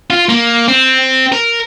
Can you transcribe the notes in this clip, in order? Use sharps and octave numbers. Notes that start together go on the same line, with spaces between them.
F4
A#3
C4
A#4